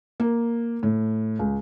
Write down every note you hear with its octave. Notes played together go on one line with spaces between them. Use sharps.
A#3
A2
C#2